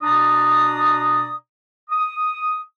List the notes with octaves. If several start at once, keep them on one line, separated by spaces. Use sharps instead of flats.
B2 D4 D5 A#5 D#6
D#6